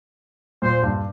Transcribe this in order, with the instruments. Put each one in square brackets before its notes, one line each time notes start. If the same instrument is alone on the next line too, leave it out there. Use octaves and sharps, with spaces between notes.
[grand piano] A#2 [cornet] C5
[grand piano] G2